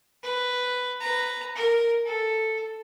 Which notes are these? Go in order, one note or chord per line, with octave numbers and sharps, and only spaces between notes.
B4
B4 A#5
A#4
A4